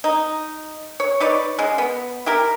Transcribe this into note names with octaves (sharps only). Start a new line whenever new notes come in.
D#4
C#5
D#4 B4 C#5 D5
C#3 G#3
B3
E4 G4 A#4